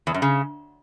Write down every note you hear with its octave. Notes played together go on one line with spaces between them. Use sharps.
E2
F#2
C#3